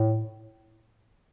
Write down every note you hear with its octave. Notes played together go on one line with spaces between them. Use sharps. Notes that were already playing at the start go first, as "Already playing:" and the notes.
Already playing: A2